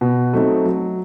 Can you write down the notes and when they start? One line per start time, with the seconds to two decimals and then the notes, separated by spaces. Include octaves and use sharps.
0.01 B2
0.33 F#3 A3 C4 D#4
0.65 F#3